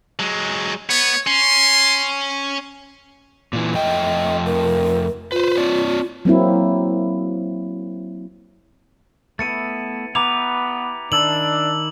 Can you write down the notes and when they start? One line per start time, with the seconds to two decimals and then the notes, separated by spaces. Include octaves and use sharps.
0.19 F#3 G#3
0.90 B3 C#5
1.27 C#4 C6
3.53 A#2 E3
3.75 F2 A3 D#5 G5
4.46 A#4
5.32 F4 B4 C5
5.57 C4 C#5 D5
6.25 F#3 A#3 C4 E4
9.39 A3 B3 E4 A6 C#7 D#7
10.15 B3 E4 G4 B4 A#5 D6 F7
11.12 D#3 D4 E4 A5 E6 F#7